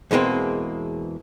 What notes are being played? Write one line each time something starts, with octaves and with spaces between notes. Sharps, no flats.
E2 B2 G#3 A#3 C4